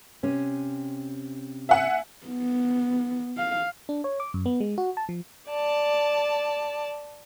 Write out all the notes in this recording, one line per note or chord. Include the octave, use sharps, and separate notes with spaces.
C3 C#4
E5 F#5 G#5
B3
F5
D4
C#5
D6
F#2
B3
G#3
F#4
A5
F3
D5 A5